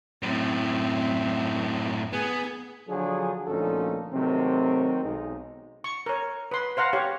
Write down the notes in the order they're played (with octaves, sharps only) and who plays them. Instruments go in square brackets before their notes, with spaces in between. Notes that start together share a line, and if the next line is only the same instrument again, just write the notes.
[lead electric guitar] F#2 A2 [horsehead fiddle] C4
[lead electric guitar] B3 [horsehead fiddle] G#4
[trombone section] D3 F3 F#3 D4 G#4
D2 A#2 F3 C#4 D#4 A4
C3 D#3 F#3 A3 C4
B1 G#3 D#4
[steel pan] C#6
A#4 C#5
B4 C6
C5 F5 F#5 A#5
G4 C#5 F5